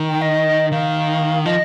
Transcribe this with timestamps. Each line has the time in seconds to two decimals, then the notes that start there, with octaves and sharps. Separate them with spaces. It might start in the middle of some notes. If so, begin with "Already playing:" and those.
Already playing: D#3
0.09 G5
0.22 D#5
0.72 D#3 F5
1.46 F3 D#5